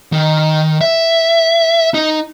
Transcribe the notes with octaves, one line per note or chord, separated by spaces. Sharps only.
D#3
E5
D#4